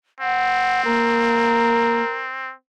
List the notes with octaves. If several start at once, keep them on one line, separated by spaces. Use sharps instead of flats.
C4 F#5
A#3 A#4